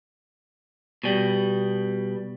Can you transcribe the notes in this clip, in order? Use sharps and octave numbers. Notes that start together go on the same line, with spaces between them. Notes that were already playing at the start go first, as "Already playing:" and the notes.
B2 G3